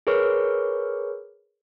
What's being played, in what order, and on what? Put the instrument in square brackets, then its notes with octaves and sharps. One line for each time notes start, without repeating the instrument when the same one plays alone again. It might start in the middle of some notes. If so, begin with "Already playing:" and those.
[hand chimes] G#4 A#4 B4 C#5 C#6 F6